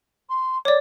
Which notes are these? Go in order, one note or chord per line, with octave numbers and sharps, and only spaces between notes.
C6
C#5 D5 D6